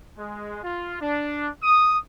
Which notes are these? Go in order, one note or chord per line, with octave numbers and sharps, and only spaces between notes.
G#3
F4
D4
D#6